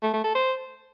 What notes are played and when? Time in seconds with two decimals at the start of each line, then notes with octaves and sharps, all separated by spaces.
0.02 A3
0.13 A3
0.24 A4
0.35 C5